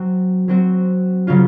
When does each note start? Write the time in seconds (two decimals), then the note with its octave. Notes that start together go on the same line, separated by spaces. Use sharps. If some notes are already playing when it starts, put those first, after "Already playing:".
Already playing: F#3 C4 F#4
0.48 F#3 C4 F#4
1.27 C#3 F#3 C#4 F4